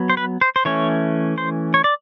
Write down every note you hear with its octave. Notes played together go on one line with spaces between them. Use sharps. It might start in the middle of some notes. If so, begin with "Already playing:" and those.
Already playing: F#3 B3
C5
B4
C5
C5
E3 A3 C#4 C#5
C5
C#5
D5